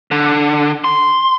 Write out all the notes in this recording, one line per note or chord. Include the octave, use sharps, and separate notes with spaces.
D3
C6